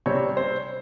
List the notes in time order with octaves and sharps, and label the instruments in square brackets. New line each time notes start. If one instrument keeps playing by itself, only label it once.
[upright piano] C3 G3 C4 [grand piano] C#5
[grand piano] C5